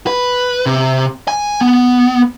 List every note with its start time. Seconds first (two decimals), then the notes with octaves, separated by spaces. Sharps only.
0.07 B4
0.66 C3
1.28 G#5
1.61 B3